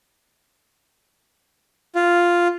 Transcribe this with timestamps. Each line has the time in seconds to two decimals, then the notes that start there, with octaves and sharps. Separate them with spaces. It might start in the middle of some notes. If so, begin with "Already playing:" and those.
1.95 F4